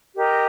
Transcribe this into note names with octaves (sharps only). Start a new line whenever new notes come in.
G4 A#4 D#5